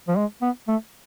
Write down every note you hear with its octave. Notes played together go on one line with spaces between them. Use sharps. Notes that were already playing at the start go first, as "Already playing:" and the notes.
F3
G#3
B3
A3